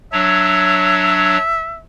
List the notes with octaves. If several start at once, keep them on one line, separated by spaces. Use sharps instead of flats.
F#3 D4 C#5 E5